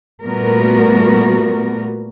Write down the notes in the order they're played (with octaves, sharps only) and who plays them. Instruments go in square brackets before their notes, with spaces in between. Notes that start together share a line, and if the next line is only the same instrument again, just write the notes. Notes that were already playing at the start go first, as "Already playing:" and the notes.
[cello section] A#2 G3 A3 B3 F#4 A#4